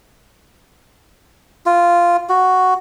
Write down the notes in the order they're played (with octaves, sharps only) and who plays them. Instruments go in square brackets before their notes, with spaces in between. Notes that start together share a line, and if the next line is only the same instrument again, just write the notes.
[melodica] F4
F#4